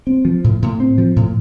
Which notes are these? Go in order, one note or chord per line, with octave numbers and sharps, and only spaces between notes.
C4
F3
A2
A2
C4
F3
A2